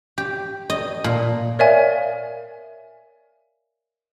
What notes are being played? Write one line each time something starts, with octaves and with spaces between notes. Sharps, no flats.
G4
D#5
A#2
A#4 C#5 D5 E5 F5 G#5